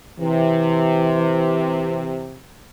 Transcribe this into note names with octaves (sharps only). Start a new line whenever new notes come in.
C3 E3